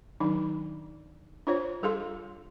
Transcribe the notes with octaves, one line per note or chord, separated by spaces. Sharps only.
D#3 F#3 D4 D#4
D4 F4 C5 C#5
G3 G#4 A4 F5 C6